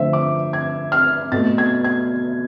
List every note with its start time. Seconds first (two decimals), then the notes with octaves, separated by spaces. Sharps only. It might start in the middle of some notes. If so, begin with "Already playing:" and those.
Already playing: D3 F3 A3 C5 E5
0.13 D6
0.53 G#6
0.92 F6
1.32 B2 A3 A6
1.58 G#6
1.84 G#6